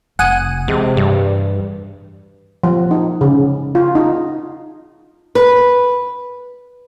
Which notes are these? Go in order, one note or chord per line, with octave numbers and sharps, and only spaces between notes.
F1 F#5 G#5 D#6
C3 E3 G#3
G2 G3
F3
D#4
C#3
F4
D#4
B4